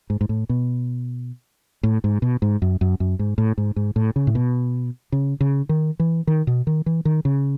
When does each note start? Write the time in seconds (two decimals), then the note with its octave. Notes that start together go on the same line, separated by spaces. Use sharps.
0.10 G#2
0.21 G#2
0.29 A2
0.49 B2
1.83 A2
2.04 G#2
2.22 B2
2.42 G#2
2.62 F#2
2.81 F#2
3.00 F#2
3.19 G#2
3.38 A2
3.58 G#2
3.76 G#2
3.96 A2
4.16 C#3
4.27 A2
4.35 B2
5.12 C#3
5.41 C#3
5.69 D#3
6.00 E3
6.27 D#3
6.47 B2
6.67 D#3
6.86 E3
7.05 D#3
7.25 C#3